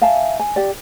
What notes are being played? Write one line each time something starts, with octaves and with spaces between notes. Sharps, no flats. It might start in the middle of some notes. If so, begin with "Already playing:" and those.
E5 F5 G#5 A5
G#5
G4 D5